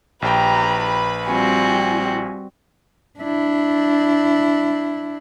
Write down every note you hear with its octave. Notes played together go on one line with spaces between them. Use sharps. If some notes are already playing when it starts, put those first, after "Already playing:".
A#1 G4 B4 G5 A#5 B5
G3 C4 F4 F#4 G#5
D4 E4